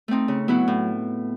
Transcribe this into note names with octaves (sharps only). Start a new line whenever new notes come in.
A3 C4 D#4
C#3
F#3 B3 E4
A2